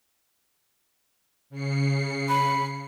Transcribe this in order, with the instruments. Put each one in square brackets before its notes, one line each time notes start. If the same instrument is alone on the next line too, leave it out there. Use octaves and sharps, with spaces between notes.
[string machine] C#3 C7 C#7
[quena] B5